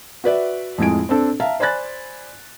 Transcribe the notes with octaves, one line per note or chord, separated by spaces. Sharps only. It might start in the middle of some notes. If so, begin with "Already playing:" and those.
F#4 B4 D5 E5
F2 A2 G#3 G#5 D7
C4 D4 A4
E5 F5 A5 A#5
C5 D5 G#5 B5 F#6 A6